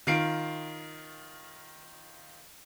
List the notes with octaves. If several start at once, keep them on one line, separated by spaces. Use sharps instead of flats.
D#3 F4 C7 D7